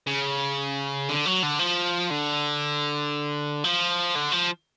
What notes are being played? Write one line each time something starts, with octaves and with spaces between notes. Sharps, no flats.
C#3
D3
F#3
D3
F3
D3
F3
D3
F3